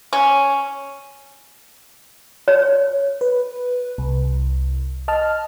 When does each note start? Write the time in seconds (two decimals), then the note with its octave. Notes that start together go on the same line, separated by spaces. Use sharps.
0.13 C#4
2.48 C#5
3.21 B4
3.98 C2
5.08 D#5 A5 F6